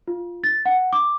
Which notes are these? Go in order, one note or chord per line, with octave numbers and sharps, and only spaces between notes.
F4
A6
F#5
D6